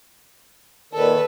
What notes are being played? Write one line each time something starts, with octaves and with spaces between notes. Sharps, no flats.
A#2 D#3 A4 B4